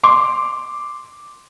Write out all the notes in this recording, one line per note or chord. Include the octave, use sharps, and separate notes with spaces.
C6 D6